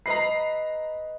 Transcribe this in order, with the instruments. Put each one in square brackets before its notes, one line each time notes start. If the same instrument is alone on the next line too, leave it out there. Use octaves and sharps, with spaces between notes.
[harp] B4 D#5 B5 [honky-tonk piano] A#5 C7